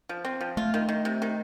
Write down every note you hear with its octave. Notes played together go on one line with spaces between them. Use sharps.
F3
C4
F3
A3 F4
D#3
D#3
C3
D#3